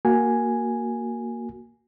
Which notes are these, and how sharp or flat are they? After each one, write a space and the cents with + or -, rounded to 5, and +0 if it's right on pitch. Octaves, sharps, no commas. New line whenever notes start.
A#3 +0 F#4 +0 G#5 +0